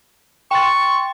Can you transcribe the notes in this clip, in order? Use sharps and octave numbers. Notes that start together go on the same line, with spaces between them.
G5 C6 C#6 A6